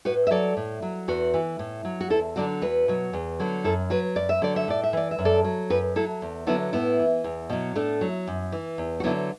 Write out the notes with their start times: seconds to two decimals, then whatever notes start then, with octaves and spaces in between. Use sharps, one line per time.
0.05 A2 F#4 B4
0.27 E5
0.31 F#3 A4 D5
0.57 A2
0.82 F#3
1.08 E2 F#4 B4
1.34 E3
1.59 A2
1.85 F#3
2.01 F#4
2.10 E2 E4 A4
2.36 D3 F#3 D4 F#4
2.62 E2 F#4 B4
2.88 B2 F#3
3.13 E2
3.40 D3 F#3
3.64 F#2 E4 A4
3.90 F#3 F#4 B4
4.16 F#2 D5
4.29 E5
4.42 D3 F#3 D5
4.56 E5
4.68 A2 D5
4.83 E5
4.93 E3 D5
5.11 E5
5.19 F#2
5.25 A4 D5
5.44 F#3
5.70 F#2 F#4 B4
5.96 F#3 E4 A4
6.22 E2
6.47 D3 F#3 B3 E4
6.73 A2 B3 E4
6.99 E3
7.24 E2
7.50 B2 F#3
7.75 A2 A3 D4
8.01 F#3
8.27 F#2
8.52 E3
8.78 E2
9.00 F#4
9.04 D3 F#3 B3 E4